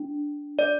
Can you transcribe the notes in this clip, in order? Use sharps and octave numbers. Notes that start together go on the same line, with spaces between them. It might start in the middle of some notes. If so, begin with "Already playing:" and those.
Already playing: D4
D5